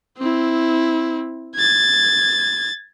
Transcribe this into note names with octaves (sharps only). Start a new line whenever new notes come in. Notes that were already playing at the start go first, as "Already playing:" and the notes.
C4 E4
G#6 A6